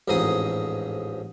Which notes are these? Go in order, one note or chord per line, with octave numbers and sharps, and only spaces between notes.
A1 F2 G#2 D#4 G#4 D#6